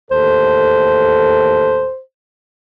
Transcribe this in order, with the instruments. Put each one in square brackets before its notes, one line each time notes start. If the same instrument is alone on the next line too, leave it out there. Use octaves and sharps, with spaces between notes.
[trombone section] D#2 A2 A4 [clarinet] C5